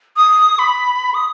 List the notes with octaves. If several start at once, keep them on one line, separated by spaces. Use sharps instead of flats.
D#6
B5
D#6